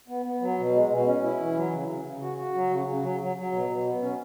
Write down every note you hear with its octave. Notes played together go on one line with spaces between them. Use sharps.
B3
B3
F#3
B2
G#3
B2
C#4
E4
E3
F#3
C#3
C#3
C#3
F#4
F#4
F#3
C#3
C#3
F#3
F#3
F#3
B2
B2
B3
C#4